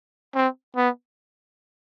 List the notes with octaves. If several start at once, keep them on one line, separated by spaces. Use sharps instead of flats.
C4
B3